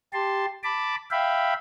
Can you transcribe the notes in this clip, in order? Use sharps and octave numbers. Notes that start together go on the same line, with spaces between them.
G4 A5 C6
A5 B5 D6
E5 F5 G5 B5